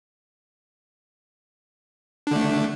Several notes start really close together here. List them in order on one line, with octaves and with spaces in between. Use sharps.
D4 D3 A3